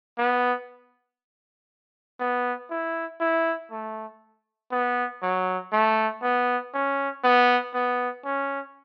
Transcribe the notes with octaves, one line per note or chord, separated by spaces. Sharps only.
B3
B3
E4
E4
A3
B3
F#3
A3
B3
C#4
B3
B3
C#4